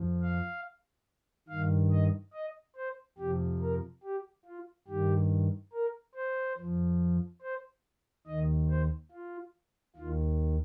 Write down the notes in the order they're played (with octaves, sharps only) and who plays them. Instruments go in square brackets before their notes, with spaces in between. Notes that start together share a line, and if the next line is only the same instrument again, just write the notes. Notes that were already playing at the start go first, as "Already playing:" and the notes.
Already playing: [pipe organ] F2 F3
F5
G2 D#3 F5
D#5
D#5
C5
F2 C3 F3 G4
A#4
G4
F4
G2 D#3 G4
A#4
C5
F2 F3
C5
D#2 D#3 D#5
C5
F4
D#2 D#3 F4